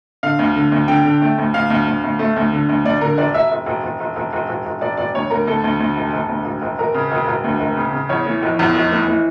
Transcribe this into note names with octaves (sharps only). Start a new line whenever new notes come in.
D3 F5
D2
D3
D2
D3 G5
D3
A3
D2
D2 F5
D2
D2
D2
A3
D2
D3
D2
D2 D5
D3 A#4
E1 D5
E1 E5
E1
E1
E1
E1
E1
E1
E1
E1
E1 D5
E1 D5
D2 C#5
D2 A#4
D2 A4
D2
D2
E1
E1
D2
E1
E1
E1 A#4
C#3
E1
E1
D2
E1
C#3
C#3
E2 C#5
E3
F1
E2
F1
E3
E3